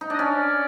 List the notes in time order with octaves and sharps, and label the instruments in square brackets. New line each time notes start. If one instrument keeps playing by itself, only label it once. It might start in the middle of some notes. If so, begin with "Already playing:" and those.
[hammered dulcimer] D#4
[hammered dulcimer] D4 [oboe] D#5
[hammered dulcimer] C#4 [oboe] D5